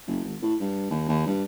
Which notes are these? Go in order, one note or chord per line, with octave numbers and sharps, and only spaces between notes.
F#1
G#1
A2
G2
D#2
D#2
G2